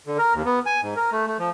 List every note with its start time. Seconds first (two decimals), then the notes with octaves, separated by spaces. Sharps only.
0.07 D3
0.18 A#4
0.34 D#2
0.45 B3
0.66 G#5
0.82 G#2
0.96 A#4
1.12 A3
1.27 A3
1.39 F3